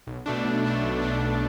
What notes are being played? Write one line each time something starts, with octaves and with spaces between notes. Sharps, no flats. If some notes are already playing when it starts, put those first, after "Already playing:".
B1
B2 A3 D4
B1
B2 A3 D4
B1
B2 A3 D4
B1